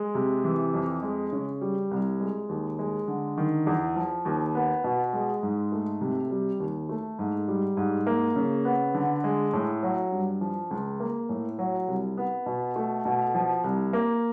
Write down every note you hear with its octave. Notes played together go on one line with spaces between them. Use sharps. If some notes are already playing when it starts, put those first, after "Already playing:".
Already playing: G#3
C3
E3
F2
G#3
C#3
G3
C2
G#3
D#2
G#3
D3
D#3
E2
F3
D#2
B3
B2
G#3
G#2
A3
C3
G3
D#2
A3
G#2
G3
G#2
A#3
C#3
B3
D3
G#3
A2
F#3
G2
F3
C#2
A#3
A2
F#3
C2
B3
B2
A3
B2
F3
C2
A#3